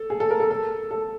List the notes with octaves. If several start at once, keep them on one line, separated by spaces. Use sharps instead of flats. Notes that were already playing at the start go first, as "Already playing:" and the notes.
Already playing: A4
G#4
A4
A#4
A4
A4
A4